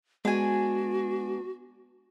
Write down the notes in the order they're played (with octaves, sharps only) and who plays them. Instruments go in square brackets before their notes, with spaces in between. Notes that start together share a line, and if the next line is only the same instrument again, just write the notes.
[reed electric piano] G#3 [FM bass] B3 [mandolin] D4 G#5 [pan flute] F#4